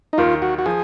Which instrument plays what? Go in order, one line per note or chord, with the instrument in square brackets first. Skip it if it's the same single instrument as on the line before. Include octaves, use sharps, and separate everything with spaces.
[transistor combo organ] D#4
[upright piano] D#2 D#3 A#3 [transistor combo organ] F4
[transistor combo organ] F#4
F#4
[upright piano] F3 [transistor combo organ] G#4